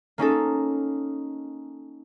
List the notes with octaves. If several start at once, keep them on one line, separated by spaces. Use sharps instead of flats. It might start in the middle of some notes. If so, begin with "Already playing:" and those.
A#3 C#4 D#4 A4